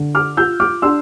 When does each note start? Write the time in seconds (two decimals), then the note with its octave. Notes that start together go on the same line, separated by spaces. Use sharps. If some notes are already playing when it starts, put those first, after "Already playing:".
Already playing: D3
0.15 D6 F6
0.37 F4 E6 G6
0.60 D6 F6
0.82 D4 C6 E6